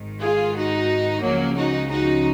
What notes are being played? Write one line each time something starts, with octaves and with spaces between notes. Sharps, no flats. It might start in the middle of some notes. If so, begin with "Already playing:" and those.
Already playing: G#1 G#2 D#3
F4 G#4
D#4 F#4
C#2 C#3 F3 F#3 A#3
D#4 F#4
D#4 F#4